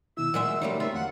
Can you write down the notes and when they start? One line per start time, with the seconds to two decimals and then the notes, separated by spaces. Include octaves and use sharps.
0.17 B2 D#3 E4 E6
0.34 A#2 F#3 G#3 E5 F#5
0.62 F#3 G3 A3 A#3 D#4
0.80 D3 A3 C4 F4 E5
0.94 E2 F#5